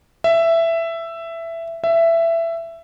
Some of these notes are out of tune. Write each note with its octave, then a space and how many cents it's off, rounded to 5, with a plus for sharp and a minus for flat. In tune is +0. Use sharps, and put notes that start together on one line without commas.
E5 +10
E5 +15